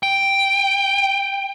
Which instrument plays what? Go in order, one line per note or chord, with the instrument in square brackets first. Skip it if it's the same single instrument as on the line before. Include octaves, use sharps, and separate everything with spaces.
[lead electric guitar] G5